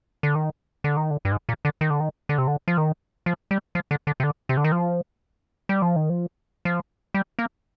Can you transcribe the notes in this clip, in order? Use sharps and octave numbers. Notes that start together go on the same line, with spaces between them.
D3
D#3
D3
D#3
D3
G2
G#2
A#2
D3
D#3
D3
D#3
D3
C3
D3
F3
D#3
F3
G3
F3
D3
D3
C3
D3
C3
D3
D#3
F3
G3
F3
D#3
F3
F3
G3
A#3